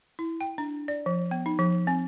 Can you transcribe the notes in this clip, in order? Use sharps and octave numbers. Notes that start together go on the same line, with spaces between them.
E4
G5
D4
D5
F3
B3
D#4
F3
C4